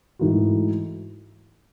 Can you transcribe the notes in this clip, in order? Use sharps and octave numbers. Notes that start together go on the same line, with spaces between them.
G#2 E3 A3 D#4 F#4